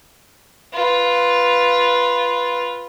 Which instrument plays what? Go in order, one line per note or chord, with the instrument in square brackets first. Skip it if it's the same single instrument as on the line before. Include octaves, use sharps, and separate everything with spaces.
[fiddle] F4 B4